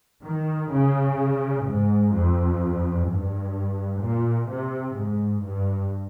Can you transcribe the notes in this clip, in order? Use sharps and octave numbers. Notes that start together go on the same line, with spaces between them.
D#3
C#3
G#2
F2
G2
A#2
C3
G#2
G2